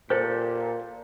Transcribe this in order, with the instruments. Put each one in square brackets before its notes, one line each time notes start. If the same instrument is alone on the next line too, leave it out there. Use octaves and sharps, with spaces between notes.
[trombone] A#2 [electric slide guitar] G4 A4 [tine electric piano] A#4 [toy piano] C5